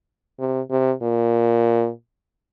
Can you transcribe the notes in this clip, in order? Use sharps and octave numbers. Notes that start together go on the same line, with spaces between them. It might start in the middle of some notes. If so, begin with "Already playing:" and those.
C3
C3
A#2